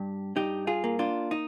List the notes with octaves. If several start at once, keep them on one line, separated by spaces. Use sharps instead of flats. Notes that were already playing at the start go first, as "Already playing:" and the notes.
Already playing: G2 G4
G2 D#4 G4
F4 G#4
A#3
D4 F4
D#4